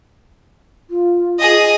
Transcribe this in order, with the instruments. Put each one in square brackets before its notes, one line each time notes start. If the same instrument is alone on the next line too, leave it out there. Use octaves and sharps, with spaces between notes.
[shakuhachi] F4
[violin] G#4 D#5